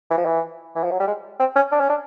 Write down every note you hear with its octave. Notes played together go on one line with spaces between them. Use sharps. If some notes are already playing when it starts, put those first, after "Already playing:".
E3
F3
E3
E3
F3
F#3
G3
G#3
C4
C#4
D4
C#4
D4